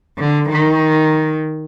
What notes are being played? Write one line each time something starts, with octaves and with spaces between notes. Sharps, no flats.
D3
D#3